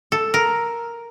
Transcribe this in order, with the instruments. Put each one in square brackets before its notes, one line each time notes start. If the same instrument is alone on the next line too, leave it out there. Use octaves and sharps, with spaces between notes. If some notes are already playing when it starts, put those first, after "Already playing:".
[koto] A4
A#4